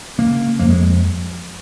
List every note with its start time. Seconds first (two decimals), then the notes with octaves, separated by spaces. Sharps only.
0.18 C#3 A#3
0.59 F2 A#3
0.70 G#3